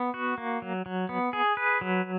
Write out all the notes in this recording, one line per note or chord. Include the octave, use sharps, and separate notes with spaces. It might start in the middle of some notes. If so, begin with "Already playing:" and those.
Already playing: B3
F#4
A#3
F#3
F#3
B3
G#4
B4
F#3